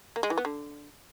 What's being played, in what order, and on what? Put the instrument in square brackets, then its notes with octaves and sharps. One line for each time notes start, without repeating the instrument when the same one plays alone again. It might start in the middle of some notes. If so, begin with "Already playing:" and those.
[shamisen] A#3
G#3
E3
B3
D3